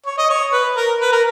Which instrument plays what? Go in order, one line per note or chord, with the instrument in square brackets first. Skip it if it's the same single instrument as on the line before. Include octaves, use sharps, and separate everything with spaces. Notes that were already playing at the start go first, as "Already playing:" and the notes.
[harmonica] C#5
D#5
C#5
B4
A#4
B4
A#4